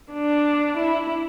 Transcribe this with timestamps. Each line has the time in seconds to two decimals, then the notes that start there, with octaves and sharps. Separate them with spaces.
0.12 D4
0.77 E4